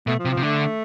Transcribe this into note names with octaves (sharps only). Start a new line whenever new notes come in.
B2 A3
F3
C3
F3
C3
D3 A3